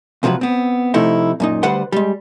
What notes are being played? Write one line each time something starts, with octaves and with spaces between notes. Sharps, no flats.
C#2 C3 F3 F#3 B4
B3 C4
C3 F3 A3 D#4 E4
F#2 A#2 D#4
D2 G3 B4 C5 F#5 C6
G3 G#3